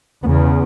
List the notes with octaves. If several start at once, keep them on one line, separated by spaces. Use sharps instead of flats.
E2 C#3 B3